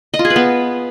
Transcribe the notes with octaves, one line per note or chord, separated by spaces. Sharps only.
D#5
F4
G#4
B4
B3